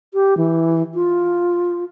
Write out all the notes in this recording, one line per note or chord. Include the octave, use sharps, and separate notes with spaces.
G4
E3
F4